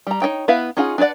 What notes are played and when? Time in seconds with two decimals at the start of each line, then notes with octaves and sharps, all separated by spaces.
0.07 G3 A#5
0.22 D#4 F#4 C#5 G5
0.48 B3 E4 B4 E5 F5
0.77 C#4 D#4 F4 G#4 F#5
0.98 D4 B4 C#5 D5 F#5